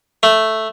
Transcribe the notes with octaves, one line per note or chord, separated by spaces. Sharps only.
A3